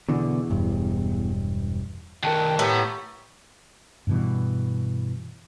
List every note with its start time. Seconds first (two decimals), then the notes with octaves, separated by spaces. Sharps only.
0.09 E2 B2 D3
0.50 E1 G2
2.23 D#3 A3 A#4 G5 A5 F#6
2.59 A2 G4 B4 F#5 A#5 D#6
4.07 G2 B2 E3